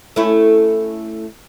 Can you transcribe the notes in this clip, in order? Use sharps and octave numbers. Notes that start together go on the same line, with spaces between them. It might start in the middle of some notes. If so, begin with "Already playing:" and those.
A3 C#4 E4